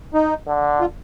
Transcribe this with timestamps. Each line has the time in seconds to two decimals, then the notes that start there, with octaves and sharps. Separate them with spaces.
0.14 D#4
0.47 D3
0.80 F4